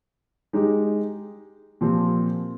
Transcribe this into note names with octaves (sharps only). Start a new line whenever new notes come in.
G#3 D#4 G4
A#2 F3 C4 G4